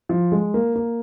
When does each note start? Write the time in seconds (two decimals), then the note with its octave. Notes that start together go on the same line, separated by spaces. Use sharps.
0.09 F3
0.32 G#3
0.54 A#3
0.76 A#3